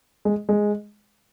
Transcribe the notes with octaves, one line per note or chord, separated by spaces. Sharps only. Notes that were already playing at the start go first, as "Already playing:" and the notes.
G#3
G#3